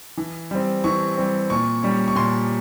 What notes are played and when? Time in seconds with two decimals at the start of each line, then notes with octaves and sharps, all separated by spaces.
0.17 E3
0.51 G3 C4
0.84 E3 C#6
1.17 G3 C4
1.50 A#2 C#6
1.83 G3 C#4
2.08 C#6
2.15 A#2 C6